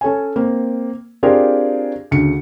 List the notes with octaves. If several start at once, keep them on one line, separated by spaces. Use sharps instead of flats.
C#4 A4 C#5 G#5
A#3 C4
C4 D4 F4 G4 G#4 A#4
D2 C#3 C#7